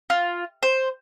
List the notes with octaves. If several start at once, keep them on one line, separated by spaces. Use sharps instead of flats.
F4
C5